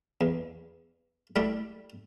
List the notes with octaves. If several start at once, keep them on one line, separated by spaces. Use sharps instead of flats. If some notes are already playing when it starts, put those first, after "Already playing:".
E2
G3 A3 E4 G4